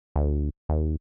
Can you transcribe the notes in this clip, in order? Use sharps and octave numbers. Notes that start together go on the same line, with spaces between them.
D2
D#2